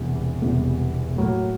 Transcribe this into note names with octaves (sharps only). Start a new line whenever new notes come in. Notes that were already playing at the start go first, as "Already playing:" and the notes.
Already playing: E1 E2 C3 E3 G3
E1 E2 C3 E3 G3
A2 F#3 A#3